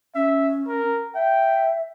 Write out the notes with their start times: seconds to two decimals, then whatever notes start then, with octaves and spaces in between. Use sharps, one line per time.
0.15 C#4 E5
0.67 A#4
1.15 E5 G5